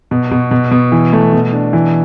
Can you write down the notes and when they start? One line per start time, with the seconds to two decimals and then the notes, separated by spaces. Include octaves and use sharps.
0.11 B2
0.31 B2
0.51 B2
0.71 B2
0.92 E3
1.13 A3
1.33 B2
1.53 D4
1.73 E3